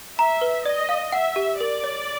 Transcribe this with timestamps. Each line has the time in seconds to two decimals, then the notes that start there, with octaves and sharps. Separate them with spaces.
0.18 E5 A#5
0.41 B4
0.65 D5 D#5
0.89 F5
1.12 E5 F#5
1.36 G4
1.59 A#4 D5
1.84 C#5